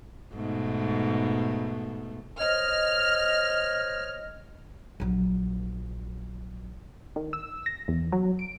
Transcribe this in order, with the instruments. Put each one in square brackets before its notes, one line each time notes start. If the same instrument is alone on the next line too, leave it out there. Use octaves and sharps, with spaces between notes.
[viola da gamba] G#2 B2 A3
[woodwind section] C5 C#5 D#5 [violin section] F6
[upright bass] A#1 F#3
[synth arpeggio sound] D#3
E6
A#6
E2
F#3
D7